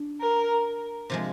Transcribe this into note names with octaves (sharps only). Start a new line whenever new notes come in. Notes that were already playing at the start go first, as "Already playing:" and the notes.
Already playing: D4
A#4
C3 F3 G#3